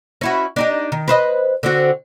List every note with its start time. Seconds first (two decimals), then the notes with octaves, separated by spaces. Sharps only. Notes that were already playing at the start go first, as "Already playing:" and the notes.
0.21 C#4 E4 F#4
0.56 D4 D#4 G4
0.92 D#3
1.08 B4 C5 D#5
1.63 D3 C4 F#4